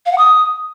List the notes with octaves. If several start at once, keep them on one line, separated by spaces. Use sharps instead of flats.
F5
F#5
D#6